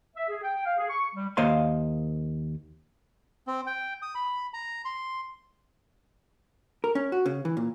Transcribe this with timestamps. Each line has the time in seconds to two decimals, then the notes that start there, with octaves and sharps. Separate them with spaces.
0.16 E5
0.28 G#4
0.42 G5
0.65 F5
0.77 G#4
0.89 C#6
1.14 G3
1.37 D#2 A#3 C5 D#5 F5 C6
3.47 C4
3.66 G5
4.02 D#6
4.15 B5
4.54 A#5
4.85 C6
6.84 A#4
6.95 C#4
7.12 F#4
7.26 C#3
7.45 E3
7.57 A#2